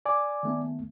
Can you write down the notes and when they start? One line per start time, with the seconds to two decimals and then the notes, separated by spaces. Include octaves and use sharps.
0.06 D5 G#5 D6
0.43 D#3 A3 B3